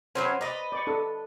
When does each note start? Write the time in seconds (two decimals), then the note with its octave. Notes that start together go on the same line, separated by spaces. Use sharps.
0.15 E3 F#3 C#4 C5
0.41 B4 D5 D#5 A#5
0.72 D5 C#6
0.87 D4 A4